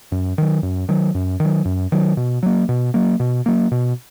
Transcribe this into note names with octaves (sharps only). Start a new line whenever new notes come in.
F#2
D#3 F#3
F#2
D#3 F#3
F#2
D#3
F#3
F#2
D#3 F#3
B2
F#3 A#3
B2
F#3 A#3
B2
F#3 A#3
B2